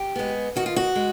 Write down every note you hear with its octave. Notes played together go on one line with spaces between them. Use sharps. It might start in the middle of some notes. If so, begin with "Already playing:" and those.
Already playing: G4
G#3 B3
D#3 F#4
F4
F#4
G#3